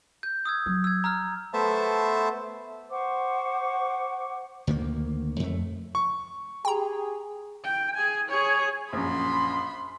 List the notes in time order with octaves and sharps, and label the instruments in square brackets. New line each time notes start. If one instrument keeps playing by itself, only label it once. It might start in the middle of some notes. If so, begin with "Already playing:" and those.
[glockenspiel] G6
D#6 E6 G#6
[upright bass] F#3
[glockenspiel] E6 G#6
A#5 E6 F6
[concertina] A3 B3 C5 E5 A5
[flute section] C5 F#5 C#6 D6
[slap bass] D2 D#3 G3 A#3
F2 A3
[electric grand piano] C#6
[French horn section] G4 G#4 [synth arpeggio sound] G5 A#5
[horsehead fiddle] G5
G#4 G#5
G#4 C#5
[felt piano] A#1 F#2 [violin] B5 C6